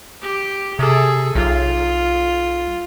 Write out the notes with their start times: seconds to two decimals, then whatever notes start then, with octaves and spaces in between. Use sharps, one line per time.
0.21 G4
0.79 C3 G#4 A4
1.35 B1 F4